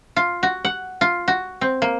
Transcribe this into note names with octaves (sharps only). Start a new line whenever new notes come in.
F4
F#4
F#5
F4
F#4
C4
A#3